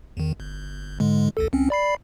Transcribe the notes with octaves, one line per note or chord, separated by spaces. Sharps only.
E2 D#3
G1
G#2 D3 G#3
A#1 D#2 A4
C#2 C4 C#4
D5 B5 C7